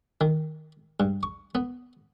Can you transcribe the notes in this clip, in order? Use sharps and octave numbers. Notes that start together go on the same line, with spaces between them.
D#3
G2
C#6
B3